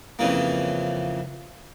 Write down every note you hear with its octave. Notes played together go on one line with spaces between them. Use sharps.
F2 C#3 E3 A#3